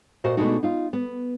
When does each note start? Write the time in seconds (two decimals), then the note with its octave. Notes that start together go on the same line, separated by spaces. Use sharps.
0.24 A#2 F#4 C5 D#5
0.37 B2 G#3 A3 D4 D#4 F#4
0.63 D#4 F4
0.93 B3